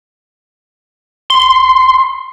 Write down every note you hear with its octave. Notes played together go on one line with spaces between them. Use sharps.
C6